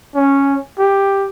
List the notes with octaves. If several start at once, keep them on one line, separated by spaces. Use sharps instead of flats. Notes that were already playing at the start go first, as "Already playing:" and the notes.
C#4
G4